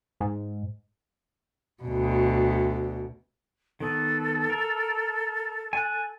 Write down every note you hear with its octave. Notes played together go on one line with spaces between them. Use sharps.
G#2
D2 B2
D#3 B3 A4
A#4
G#5 F#6